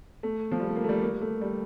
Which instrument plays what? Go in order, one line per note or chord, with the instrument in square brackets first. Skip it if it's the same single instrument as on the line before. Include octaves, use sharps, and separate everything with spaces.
[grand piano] A3
F3
G3
A3
A#3
A3
G3
A#3
A3
G3